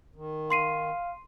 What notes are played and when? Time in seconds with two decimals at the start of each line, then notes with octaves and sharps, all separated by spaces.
0.16 D#3
0.50 F5 C6 C7 D#7